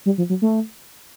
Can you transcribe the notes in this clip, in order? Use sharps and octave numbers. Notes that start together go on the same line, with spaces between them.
G3
F3
F#3
A3